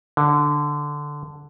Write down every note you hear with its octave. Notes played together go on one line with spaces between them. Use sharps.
D3